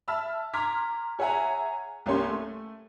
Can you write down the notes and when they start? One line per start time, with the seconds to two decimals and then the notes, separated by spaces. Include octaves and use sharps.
0.08 E5 A5 B5 E6 F6
0.54 A#5 C6 D6 F6 G#6 B6
1.19 G#4 C#5 E5 F#5 G#5 A#5
2.06 C2 A#3 C#4 G4 C#5 C6
2.29 A3